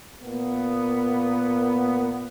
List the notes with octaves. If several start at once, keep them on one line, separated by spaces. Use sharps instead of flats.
A#2 A#3 B3